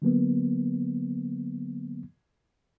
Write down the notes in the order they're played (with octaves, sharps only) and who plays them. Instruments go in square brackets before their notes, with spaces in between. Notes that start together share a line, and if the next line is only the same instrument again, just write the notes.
[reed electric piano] D3 F#3 A#3 B3